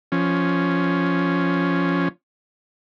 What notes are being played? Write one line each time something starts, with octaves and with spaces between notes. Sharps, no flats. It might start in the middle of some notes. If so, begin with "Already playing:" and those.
F3 C#4